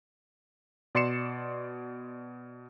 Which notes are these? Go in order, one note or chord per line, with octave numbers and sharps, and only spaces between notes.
B2 D5 C6 C7 C#7 E7